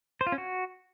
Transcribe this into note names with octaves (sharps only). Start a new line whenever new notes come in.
C5
F4
C#4
F#4